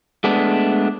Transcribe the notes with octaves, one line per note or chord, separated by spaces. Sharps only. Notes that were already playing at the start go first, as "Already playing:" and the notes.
G#3 A3 B3 D4